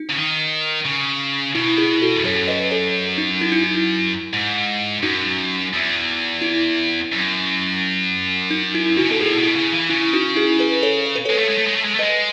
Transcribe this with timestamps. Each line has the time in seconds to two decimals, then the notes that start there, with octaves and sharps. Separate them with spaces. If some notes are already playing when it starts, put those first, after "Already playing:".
Already playing: D#4
0.10 C#3
0.16 D#3
0.85 C#3
1.55 B2 E4
1.78 E4 G#4
2.02 F#4 A4
2.15 E2
2.24 F#2 A4 C#5
2.48 B4 D#5
2.71 A4 C#5
3.18 D#4
3.41 E4
3.52 D#4
3.64 E4
4.33 G#2
5.03 F#2 D#4 F#4
5.73 E2
6.42 E4
7.12 F#2
8.51 D#4
8.75 E4
8.97 C#3 D#4 F#4
9.10 B2 A4
9.20 A2 E4 G#4
9.38 B2
9.43 E4
9.56 C#3
9.72 E3
9.89 C#3 E4
10.13 D#4 F#4
10.36 E4 G#4
10.59 G#4 B4
10.83 A4 C#5
11.06 C#5
11.15 B4
11.25 G#3 A4 C#5
11.38 A3
11.48 G#3
11.57 A3
11.67 G#3
11.76 A3
11.84 G#3
11.94 A3
11.99 G#3 B4 D#5